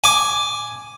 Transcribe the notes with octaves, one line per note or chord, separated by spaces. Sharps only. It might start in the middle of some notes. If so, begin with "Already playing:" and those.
G#5 D6